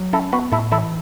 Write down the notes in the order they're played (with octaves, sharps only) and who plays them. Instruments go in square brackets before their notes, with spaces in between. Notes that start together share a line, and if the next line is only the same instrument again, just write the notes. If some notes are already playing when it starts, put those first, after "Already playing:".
Already playing: [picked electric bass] F#3
[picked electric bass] C#4 [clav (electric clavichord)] E4 A4
[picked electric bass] B3 [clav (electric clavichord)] F#4 B4
[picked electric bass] A2 [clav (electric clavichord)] E4 A4
[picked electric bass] E3 [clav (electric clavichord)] E4 A4